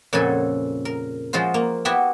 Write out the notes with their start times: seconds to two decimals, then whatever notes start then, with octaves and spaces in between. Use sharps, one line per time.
0.13 F2 A#2 C#3 F#4 A4 G#5
0.85 A#4
1.33 F3 G#3 F4 F#4 C5
1.54 A#3
1.85 B3 E4 F#4 G4 E5 G5